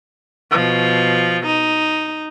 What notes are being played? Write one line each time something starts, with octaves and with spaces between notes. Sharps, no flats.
B2 F3
D#4